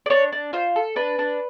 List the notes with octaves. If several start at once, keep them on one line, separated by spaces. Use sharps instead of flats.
D5
D4 C#5
D4
F4 C5
A4
D4 B4
D4